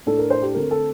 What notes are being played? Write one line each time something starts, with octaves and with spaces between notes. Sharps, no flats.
A2 A3 D4 A4
A#4
C5
G4
D3 A3 C4 A#4
A4